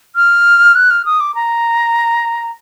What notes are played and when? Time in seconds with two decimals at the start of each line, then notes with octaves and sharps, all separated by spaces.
0.16 F6
0.75 F#6
0.91 F6
1.05 D#6
1.20 D6
1.35 A#5